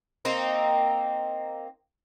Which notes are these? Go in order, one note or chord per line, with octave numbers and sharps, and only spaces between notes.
A#3 C4 D#4